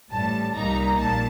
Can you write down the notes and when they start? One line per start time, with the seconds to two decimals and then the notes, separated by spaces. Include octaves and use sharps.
0.10 A1 A2 G3 A5
0.55 C2 A#2 G3 A#3 D#4 A#5
0.99 A#1 A#2 A5